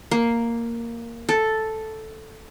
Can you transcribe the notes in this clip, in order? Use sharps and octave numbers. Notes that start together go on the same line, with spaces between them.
A#3
A4